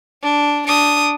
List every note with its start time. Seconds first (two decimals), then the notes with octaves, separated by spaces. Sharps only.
0.22 D4
0.67 D4 D#6